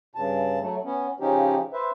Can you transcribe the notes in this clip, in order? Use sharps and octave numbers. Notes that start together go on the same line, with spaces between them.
G2 C#3 A5
F#3 A3
B3 C#4
C#3 F3 C#4 D#4 G4
B4 C5 E5